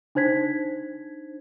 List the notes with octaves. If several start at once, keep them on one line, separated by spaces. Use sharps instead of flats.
D4 D#4 C5 G#6 B6